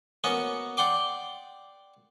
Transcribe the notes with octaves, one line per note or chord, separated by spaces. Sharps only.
A#3 B3 C#4 F#4 D#5
D5 F#5 G5 C6 D6